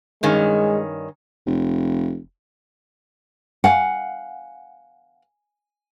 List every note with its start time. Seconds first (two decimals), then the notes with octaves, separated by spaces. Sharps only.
0.23 G2 D#3 G#3 C#4
1.46 F1
3.64 F5 F#5 G#5